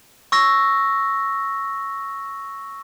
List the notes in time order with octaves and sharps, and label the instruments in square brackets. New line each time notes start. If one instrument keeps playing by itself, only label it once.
[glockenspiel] C#6 E6 A#6